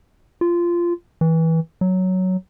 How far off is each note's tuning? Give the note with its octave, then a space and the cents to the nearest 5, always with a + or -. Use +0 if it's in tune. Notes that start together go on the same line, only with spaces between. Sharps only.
F4 -15
E3 -20
F#3 +5